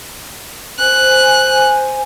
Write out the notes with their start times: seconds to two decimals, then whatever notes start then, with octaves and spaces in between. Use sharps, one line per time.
0.79 C5 G#5 F#6